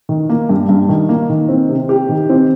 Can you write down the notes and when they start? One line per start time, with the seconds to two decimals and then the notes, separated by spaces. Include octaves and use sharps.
0.09 D#3
0.29 A#3
0.49 G2
0.69 G2
0.89 D#3
1.09 A#3
1.29 D#3
1.49 C4
1.69 C3
1.89 G4
2.09 D#3
2.29 C4